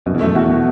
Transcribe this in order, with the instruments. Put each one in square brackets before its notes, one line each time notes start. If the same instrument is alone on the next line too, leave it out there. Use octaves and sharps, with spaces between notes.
[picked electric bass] F#2 [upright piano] B2
[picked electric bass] E2
[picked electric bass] F#2 [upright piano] A3
[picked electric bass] E2 [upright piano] F#4
[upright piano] B2